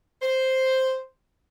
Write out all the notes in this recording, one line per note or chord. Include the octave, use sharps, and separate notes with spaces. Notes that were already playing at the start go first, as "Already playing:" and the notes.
C5